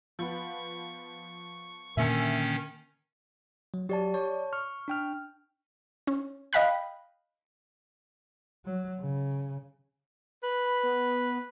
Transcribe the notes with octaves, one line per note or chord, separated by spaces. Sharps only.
F3 B3 C#6
A#2 D3 D#3 A#3 C#4 E5 G#5 C#7
F#3
F#3 G4 D5 A5
C#5 D5 A5 C#6
C#6 F6
D4 G5 F6
C#4
D#5 F5 G5 B5 F#6
F#3
C#3
B4
B5
B3